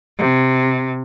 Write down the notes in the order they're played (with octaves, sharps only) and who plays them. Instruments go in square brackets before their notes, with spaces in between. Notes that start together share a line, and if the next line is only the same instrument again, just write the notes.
[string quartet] C3